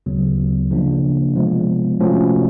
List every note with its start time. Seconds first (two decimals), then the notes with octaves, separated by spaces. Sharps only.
0.06 D2 C#3 F#3 B3
0.71 C#3 F3 A#3 D4
1.35 C3 F3 G#3 B3
1.99 C3 F3 A3 C#4 F#4